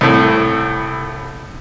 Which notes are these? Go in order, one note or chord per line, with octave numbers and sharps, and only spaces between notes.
C2 A2